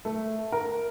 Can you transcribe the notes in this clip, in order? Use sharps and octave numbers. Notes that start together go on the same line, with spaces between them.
A3
A#4